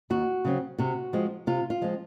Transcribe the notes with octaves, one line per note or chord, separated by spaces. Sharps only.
D#2 F#4
C#3 F#3 C4
C3 F#4
F3 G#3 C4
C3 F4
F4
F3 G#3 C4